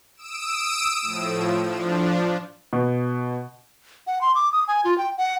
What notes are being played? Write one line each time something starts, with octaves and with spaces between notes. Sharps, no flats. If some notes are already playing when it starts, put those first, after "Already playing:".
D#6 E6 D7 E7
A2 F3
F3 D4
B2
F#5
C6
D6
D#6
G#5
F4
G5
F#5